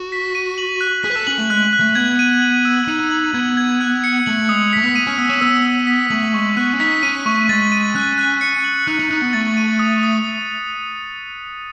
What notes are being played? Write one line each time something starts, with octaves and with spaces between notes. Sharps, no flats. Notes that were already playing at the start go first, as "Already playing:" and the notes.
Already playing: F#4
B6
D#7
F#7
F#6
G#4 B6
B4
A4
C#4 F#7
A3
G#3 F#6
F#6
A3
B3 G#6
D#7
F#7
E6
D#4 D#7
F#7
B3 G#6
G#6
F#6
C#7
A3 F#7
G#3 D#6
A3 B6
B3
D#7
C#4
B3 E6
C#4
B3 E6
E6
B6
A3 F#7
G#3 C#6
B3 F#6
C#4
D#4 B6
C#4 D#7
A3 C#6
G#3 A6
D#7
C#4 F#6
F#6
C#7
F#7
D#4 F#6
D#4
D#4 F#6
B3
A3 A6
D#7
D#6
D#6